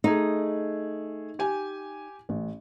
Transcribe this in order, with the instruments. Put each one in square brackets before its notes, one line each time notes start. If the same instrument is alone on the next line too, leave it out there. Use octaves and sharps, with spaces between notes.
[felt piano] A3 G#4 [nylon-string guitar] D#4
[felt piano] G4 G#5
A1